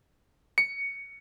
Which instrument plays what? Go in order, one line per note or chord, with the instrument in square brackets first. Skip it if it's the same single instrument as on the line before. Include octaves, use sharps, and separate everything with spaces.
[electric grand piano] C#7